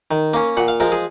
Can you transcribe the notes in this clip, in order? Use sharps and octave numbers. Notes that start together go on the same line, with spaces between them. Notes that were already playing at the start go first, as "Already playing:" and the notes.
D#3
A#3 C#4
A#2 F#5
F5
F3 G#3 A#4
G#4